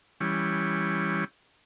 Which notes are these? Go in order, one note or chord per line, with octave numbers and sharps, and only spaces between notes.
E3 G3 C#4